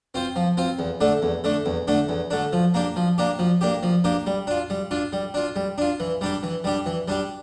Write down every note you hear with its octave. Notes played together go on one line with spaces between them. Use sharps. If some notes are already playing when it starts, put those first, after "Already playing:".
C4 F4 C5
F3
C4 F4 C5
E2
D3 A3 D4
E2
D3 A3 D4
E2
D3 A3 D4
E2
D3 A3 D4
F3
A#3 D4 G4
F3
A#3 D4 G4
F3
A#3 D4 G4
F3
A#3 D4 G4
G3
D4 F4
G3
D4 F4
G3
D4 F4
G3
D4 F4
E3
G3 D4 G4
E3
G3 D4 G4
E3
G3 D4 G4